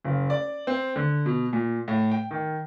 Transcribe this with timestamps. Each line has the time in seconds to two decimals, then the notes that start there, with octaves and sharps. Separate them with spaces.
0.05 F#1
0.30 D5
0.67 C4
0.96 D3
1.26 B2
1.53 A#2
1.88 A2
2.12 G5
2.31 D#3